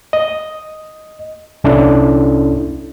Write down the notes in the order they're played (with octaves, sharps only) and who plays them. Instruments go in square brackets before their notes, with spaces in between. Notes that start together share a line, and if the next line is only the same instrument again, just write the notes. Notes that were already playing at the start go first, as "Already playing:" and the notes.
[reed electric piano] D#5
C2 C#4 D4 E4 A4